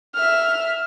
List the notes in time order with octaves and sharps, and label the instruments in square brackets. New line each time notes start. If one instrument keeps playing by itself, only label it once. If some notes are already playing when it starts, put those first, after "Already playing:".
[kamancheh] E5 F6